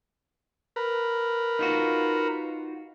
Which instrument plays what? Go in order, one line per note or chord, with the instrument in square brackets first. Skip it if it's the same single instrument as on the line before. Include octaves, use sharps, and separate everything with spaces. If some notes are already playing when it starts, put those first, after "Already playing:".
[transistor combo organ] A#4 B4
[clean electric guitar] D#4 F4 F#4